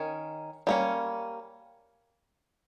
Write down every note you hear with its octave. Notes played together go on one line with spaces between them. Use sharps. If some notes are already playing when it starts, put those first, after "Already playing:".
Already playing: D#3 C#4
G3 A#3 C#4